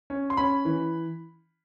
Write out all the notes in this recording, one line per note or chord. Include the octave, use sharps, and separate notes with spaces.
C#4
C6
C#4 B5
E3